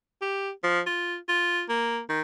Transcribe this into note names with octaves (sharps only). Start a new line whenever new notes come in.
G4
F3
F4
F4
A#3
D#3